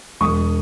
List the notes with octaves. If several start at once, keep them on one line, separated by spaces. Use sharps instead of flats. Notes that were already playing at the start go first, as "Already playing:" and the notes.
E1 C#6 D#6